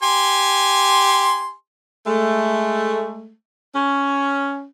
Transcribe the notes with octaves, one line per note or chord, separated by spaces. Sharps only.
G4 G#5 C6
G#3 A3
C#4